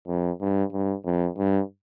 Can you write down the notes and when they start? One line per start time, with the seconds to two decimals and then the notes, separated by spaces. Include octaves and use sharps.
0.08 F2
0.41 G2
0.73 G2
1.05 F2
1.38 G2